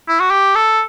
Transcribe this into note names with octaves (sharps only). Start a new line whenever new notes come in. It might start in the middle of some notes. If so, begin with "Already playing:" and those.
E4
F#4
G4
A4